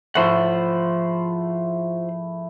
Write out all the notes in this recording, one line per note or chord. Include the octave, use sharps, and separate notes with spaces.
G#2 F3 A3 E4 F4 C5 F#5